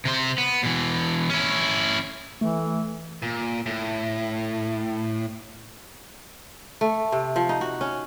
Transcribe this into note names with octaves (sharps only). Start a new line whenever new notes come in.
C3 C5
B3
B2 E3
C#4 E4
E3 A3
A#2
A2
A3
C3
F3
D#4
F#4
C#4